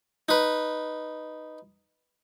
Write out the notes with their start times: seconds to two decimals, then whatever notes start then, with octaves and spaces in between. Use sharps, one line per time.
0.29 D#4 B4